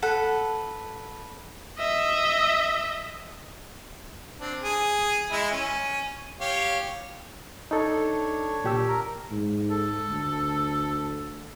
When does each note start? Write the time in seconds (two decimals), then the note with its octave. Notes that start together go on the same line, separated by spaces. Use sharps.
0.02 A4 B4 F#5
1.79 D#5 E5
4.39 C4 D4
4.62 G#4
5.32 G#3 E4
5.51 C#4
6.40 G4 C#5 F5
7.71 D4 D#4 A4 C#5
8.64 A#2 G4 E6
8.88 A#4
9.31 G#2
9.71 A4
10.09 D2